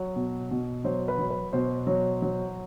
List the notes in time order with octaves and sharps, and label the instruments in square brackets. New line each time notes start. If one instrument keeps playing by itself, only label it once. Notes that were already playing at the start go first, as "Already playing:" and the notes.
Already playing: [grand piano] F#3
B2
B2
F#3 C5
B4
F#3
B4
B2 C5
F#3
F#3